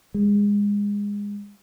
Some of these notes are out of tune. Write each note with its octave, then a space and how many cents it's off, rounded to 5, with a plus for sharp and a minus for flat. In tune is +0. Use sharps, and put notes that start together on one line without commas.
G#3 -25